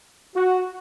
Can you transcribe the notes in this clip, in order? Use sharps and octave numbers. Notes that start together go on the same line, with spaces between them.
F#4